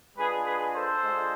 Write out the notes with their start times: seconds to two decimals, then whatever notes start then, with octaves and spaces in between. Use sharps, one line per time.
0.17 G#3 D4 F4 G#4 B4
0.45 G#4 B4
0.74 A4 C5
1.02 G#3 D4 F4